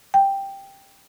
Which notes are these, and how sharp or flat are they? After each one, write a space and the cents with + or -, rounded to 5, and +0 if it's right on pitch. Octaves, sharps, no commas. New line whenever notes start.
G5 +5